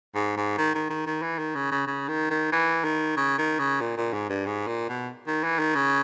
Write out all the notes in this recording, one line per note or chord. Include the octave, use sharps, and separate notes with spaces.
G#2
G#2
D#3
D#3
D#3
D#3
E3
D#3
C#3
C#3
C#3
D#3
D#3
E3
D#3
C#3
D#3
C#3
A#2
A#2
G#2
G2
G#2
A#2
B2
D#3
E3
D#3
C#3